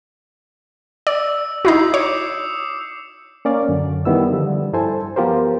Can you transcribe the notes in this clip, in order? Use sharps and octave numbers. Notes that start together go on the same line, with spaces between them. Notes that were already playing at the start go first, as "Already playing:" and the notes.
D5 E6
D#4 E4 F#4 D#6 G6 C7
C#5 D6 D#6 C#7
A#3 C#4 D5 F5
F#2 D3
D#3 G3 B3 E4 E6
D3 F3 G3
G2 E4 A4 C5 G#5 A5
F3 B3 F4 G4 A#4 C5